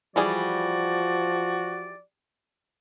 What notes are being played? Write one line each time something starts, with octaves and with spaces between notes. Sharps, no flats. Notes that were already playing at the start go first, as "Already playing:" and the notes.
E3 F3 G3 F#4 G#4 D5